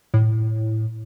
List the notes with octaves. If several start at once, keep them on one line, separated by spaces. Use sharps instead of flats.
A2